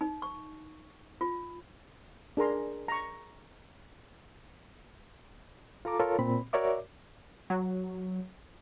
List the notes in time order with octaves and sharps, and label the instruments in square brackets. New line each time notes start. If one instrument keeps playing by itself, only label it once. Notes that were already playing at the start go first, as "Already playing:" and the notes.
[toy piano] D#4
C#6
F4
[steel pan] D4 G#4 A#4 A#5 C6
A#5 C#6
[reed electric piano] F4 A4 A#5 D6
F4 A4 A#4 C#5
A#2 C4 B5
F#4 A#4 C#5 D5 E5 D6
[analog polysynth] F#3